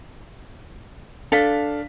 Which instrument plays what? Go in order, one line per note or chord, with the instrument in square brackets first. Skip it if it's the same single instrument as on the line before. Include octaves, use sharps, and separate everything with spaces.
[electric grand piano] D4 F5 B6 [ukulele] A4